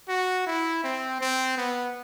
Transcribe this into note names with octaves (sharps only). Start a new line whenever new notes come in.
F#4
E4
C4
C4
B3